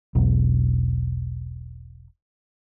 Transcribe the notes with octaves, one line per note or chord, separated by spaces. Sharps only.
E1 B1